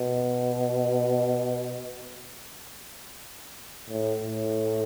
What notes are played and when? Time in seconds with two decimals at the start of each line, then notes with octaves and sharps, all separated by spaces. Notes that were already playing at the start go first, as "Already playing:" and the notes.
Already playing: B2
3.90 A2
4.23 A2